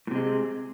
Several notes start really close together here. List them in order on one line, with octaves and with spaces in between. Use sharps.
A2 C3 G#3